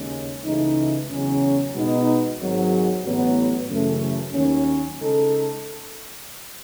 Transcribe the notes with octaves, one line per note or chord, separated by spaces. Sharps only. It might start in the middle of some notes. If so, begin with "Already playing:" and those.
Already playing: D#2 C#3 G#3 C#4
C#2 C#3 E3 A3 D#4
E2 C#3 F#3 C#4
B2 G#3 B3 D#4
G#1 G#2 F#3
A1 A2 F#3 B3
F#2 C#3 E3 A3 C#4
D#2 D#3 F#3 C#4
C#3 G#3 D#4 A4